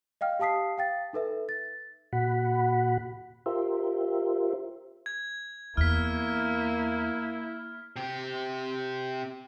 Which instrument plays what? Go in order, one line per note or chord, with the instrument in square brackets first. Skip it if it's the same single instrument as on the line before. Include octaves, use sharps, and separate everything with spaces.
[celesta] D#5 F5 G5 F6
G4 F5 A5 D#6 B6 C7
F5 G5 A6
D#4 A4 B4 E5
A6
[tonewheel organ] A#2 F#4 F#5 B5
F4 G4 A#4 C5 E5
[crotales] G#6
[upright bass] E2 [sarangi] A#3 [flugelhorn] E4 [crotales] F6 B6
[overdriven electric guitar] C3 G4